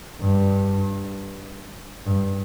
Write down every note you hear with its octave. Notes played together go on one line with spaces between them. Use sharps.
G2
G2